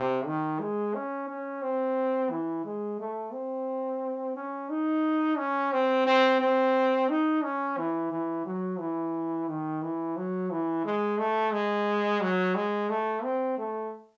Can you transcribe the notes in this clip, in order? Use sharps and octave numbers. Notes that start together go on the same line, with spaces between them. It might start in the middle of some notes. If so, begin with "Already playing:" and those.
Already playing: C3
D#3
G#3
C#4
C#4
C4
E3
G#3
A3
C4
C#4
D#4
C#4
C4
C4
C4
D#4
C#4
E3
E3
F#3
E3
D#3
E3
F#3
E3
G#3
A3
G#3
F#3
G#3
A3
C4
A3